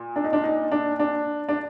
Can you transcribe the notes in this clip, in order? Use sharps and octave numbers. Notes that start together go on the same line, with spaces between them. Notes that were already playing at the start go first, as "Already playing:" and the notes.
Already playing: A#2
D4
D#4
D4
D#4
D4
D4
D4